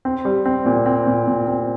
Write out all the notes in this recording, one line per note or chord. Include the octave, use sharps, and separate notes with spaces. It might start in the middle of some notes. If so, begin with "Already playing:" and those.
C4
G3
C4
A#2
C4
A#2
A#2
C4